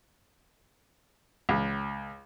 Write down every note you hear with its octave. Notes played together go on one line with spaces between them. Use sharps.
C#2